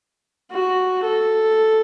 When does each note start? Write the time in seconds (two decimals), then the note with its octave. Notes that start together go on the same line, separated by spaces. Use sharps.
0.52 F#4
1.03 A4